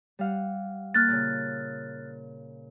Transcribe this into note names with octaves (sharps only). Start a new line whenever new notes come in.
G3 F5 F#5
A#3 F6 F#6 A6
A#2 C#3